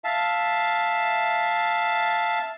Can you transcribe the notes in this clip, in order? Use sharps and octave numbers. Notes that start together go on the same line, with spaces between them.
E5 F5 A5